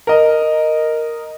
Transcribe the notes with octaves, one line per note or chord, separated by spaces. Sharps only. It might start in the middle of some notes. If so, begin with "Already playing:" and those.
A#4 D#5